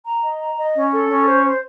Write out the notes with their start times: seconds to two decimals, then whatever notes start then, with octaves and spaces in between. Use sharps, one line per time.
0.05 A#5
0.23 D#5
0.40 A#5
0.57 D#5
0.75 C#4
0.92 A4
1.09 C#4
1.26 C5
1.43 C5